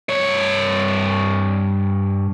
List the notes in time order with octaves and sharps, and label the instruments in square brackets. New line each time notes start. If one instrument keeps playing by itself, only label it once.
[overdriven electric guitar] G2 C#5